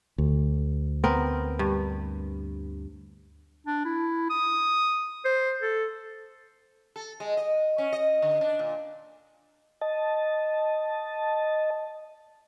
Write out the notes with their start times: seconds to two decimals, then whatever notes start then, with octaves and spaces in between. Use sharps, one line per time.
0.18 D2
1.04 B3 C4 A#4
1.59 G2
3.67 D4
3.85 E4
4.30 D#6
5.25 C5
5.62 A4
6.96 A4
7.20 G#3
7.37 D#5
7.78 C#4
7.93 D#5
8.22 D3
8.41 D4
8.59 A#2
9.81 D#5 A5